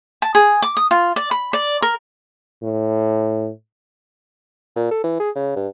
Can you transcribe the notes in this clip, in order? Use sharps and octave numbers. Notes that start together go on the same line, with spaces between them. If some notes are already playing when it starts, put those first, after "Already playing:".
A5
G#4
D6
D#6
F4
D5
B5
D5
A#4
A2
A#2
A4
E3
G#4
C#3
G2